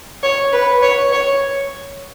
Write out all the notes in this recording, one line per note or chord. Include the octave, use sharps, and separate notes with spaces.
C#5
B4
C#5
C#5